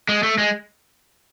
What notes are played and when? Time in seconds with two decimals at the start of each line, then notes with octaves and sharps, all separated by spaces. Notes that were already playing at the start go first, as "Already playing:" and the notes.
0.09 G#3
0.23 A3
0.38 G#3